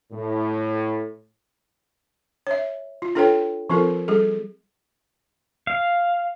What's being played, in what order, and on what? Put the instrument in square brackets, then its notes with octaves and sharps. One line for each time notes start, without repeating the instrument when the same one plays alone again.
[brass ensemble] A2
[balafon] C#5 E5
F4
D4 F4 A4 B4 C#5 G5
F3 C4 F4 A4 A#4
G3 G#4 A4
[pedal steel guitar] F5